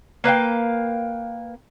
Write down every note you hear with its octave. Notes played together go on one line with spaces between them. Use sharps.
A#3 B4 F5 G5